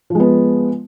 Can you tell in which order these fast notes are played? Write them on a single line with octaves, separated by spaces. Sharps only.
F3 G#3 B3